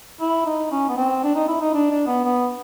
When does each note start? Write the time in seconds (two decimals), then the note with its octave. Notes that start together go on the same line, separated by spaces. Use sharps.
0.21 E4
0.46 D#4
0.72 C#4
0.89 B3
0.97 C4
1.24 D4
1.35 D#4
1.48 E4
1.61 D#4
1.74 D4
1.91 D4
2.07 B3
2.24 B3